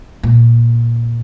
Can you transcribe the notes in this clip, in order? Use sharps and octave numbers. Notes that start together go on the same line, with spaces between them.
A#2